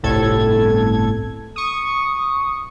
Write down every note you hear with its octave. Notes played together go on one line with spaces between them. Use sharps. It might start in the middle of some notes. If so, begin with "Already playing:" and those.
G1 C2 A2 A4 G#6
C#6 D#6